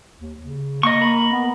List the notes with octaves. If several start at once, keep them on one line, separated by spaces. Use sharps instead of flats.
D#2
C#3
A#3 D#5 C#6
A#4 B5
B3